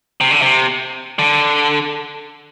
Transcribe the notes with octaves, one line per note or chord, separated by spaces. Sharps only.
C3
D3
C3
D3